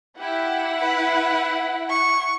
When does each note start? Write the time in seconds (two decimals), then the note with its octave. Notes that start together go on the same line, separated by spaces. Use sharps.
0.20 E4 G4 F#5
0.80 B4
1.90 C#6